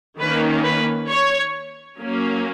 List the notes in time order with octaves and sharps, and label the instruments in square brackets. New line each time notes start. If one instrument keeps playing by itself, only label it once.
[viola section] D#3 A#3 C#4 B4
B4
C#5
F#3 A#3 C#4